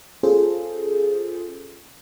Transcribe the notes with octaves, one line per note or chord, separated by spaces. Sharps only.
C#4 F4 G#4 A4 C5